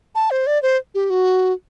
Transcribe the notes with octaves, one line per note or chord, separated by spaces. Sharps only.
A5
C5
D5
C5
G4
F#4